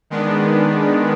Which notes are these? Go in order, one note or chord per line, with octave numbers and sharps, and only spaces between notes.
D#3 G#3 B3 D4